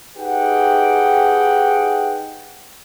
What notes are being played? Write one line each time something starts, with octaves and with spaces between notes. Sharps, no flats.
D#4 G4 G#4 B4 F#5 G5